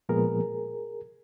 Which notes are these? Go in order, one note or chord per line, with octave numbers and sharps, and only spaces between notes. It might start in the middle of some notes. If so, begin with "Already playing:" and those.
A#2 F3 G#3 B3 G#4 A#4